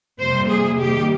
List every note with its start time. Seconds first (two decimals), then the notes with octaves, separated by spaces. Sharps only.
0.18 F2 C3 G3 A#3 C5
0.49 G#4
0.78 C3 D#3 G3 A#3 G4